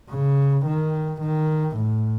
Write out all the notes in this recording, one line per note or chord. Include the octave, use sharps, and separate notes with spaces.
C#3
D#3
D#3
A2